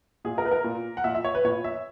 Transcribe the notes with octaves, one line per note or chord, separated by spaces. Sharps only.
A#2 G#4
A#4
B4
A#4
A#2
F#5
A#2 E5
E5
C#5
B4
A#2 C#5
E5